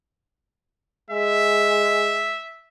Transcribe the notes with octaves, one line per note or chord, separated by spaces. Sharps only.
G#3 E5